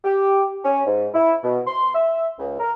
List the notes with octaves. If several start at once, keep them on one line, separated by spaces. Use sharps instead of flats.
G4
C#4
G#2
E4
B2
C6
E5
C#2
A#4